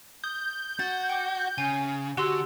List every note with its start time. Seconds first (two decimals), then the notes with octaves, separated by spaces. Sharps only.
0.24 D#6 G6
0.79 F#4 A6
1.10 G5 D6
1.58 C#3 G#5
2.17 D3 F#4 G4 C6 E6